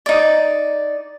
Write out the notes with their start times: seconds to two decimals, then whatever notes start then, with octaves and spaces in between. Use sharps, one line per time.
0.06 D#4 D5